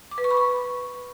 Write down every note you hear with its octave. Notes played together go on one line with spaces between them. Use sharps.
D6
B4
C#6
B5
C#6